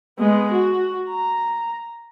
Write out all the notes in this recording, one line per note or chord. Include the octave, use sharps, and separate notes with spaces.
G#3 B3
F#4
A#5